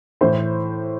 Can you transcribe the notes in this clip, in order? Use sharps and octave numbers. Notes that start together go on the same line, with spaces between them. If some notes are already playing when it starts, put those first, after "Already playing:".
A2 E3 C5